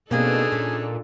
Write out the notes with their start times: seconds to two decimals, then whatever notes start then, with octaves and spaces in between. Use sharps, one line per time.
0.11 B2 A#3 C4 D4 D#4 G#4 A4
0.52 A#2 C#4